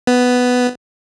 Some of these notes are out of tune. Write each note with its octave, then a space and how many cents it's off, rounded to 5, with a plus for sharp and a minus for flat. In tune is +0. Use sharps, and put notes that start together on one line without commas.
B3 +5